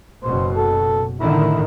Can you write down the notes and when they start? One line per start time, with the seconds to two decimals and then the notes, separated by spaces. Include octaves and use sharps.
0.24 F#1 B2 C5
0.56 A4
1.21 A2 D3 D#3 E4